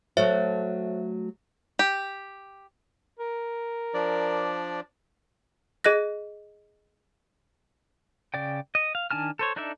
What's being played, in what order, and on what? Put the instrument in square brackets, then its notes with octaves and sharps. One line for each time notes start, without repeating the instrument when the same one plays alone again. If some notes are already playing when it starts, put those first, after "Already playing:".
[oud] F#3 A3 F#4 [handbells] C5 C#5 E5
[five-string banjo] G4
[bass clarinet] A#4
[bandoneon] F3 D4 D5
[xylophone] G#4 D#5 F#6 A#6
[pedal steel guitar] C#3 D5 G5
D#5
F5
D#3 D4 G#5 A5 F6
A4 C5 C#5
D4 D#4 A4 D5 E5